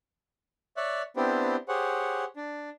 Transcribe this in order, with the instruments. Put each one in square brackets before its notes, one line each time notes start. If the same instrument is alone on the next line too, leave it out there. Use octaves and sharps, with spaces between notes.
[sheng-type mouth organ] C#5 D5 E5 F#6
B3 C4 D4 E4 G4 C5
G4 G#4 C5 C#5 F#5
D4